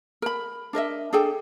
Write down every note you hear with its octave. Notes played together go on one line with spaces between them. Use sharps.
A#4 B5
D4 A#4 D#5 E5
D4 G#4 A4 G5